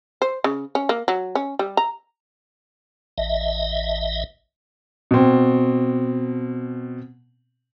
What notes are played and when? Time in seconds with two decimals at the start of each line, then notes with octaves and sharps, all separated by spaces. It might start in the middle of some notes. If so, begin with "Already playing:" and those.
0.22 C5
0.44 C#3
0.75 C#4
0.89 A#3
1.08 F#3
1.35 C#4
1.59 G3
1.77 A#5
3.18 A1 D#5 E5
5.11 B2 C4